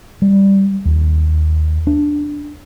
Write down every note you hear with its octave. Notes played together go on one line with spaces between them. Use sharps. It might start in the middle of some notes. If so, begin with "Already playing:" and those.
G3
D#2
D4